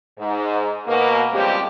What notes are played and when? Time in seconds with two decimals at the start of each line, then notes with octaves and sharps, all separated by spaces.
0.18 G#2
0.87 B2 A#3
1.33 C#3 F3 G3 G#3 C4 G4